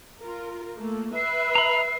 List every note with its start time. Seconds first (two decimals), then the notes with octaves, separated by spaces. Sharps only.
0.21 F4 A#4
0.77 A3 A#3
1.16 B4 E5 C7
1.55 A#5 B5